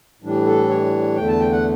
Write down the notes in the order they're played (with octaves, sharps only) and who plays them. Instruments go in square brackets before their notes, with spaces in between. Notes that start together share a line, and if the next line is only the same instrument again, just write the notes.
[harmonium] A2 E3 G3 D4
A4
C#5
E2 D3 A3 G5
A5
G5
F#5